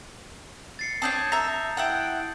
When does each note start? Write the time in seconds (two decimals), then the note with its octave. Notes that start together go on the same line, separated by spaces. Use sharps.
0.79 A6 C7 C#7
1.02 C4 D4 C#5 A5 D#6 G6
1.32 E5 A#5
1.77 E4 F#5 G5